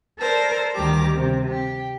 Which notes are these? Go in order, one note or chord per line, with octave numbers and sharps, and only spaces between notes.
A4 A#4 C5 D5
D2 D#3 G3 G4 A#5 D6
C3
G4